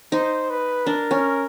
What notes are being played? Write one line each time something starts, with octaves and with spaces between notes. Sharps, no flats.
D#4 C5
B4
D4 A#4
C#4